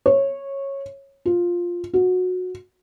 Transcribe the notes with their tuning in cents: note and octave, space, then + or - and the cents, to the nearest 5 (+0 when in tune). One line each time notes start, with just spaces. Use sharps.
C#5 -15
F4 +5
F#4 -20